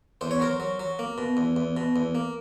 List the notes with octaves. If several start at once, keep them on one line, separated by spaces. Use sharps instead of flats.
E2 C5
C#5
F#3 A#4 C5
F#3
F#3
A#3
B2
E2
E2
B2
E2
A#3